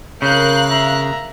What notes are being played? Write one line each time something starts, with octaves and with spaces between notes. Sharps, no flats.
C#3 A#4 F5 F#6 G6
E5 A#5